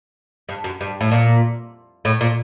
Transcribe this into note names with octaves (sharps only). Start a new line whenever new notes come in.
G2
F#2
G2
A2
A#2
A2
A#2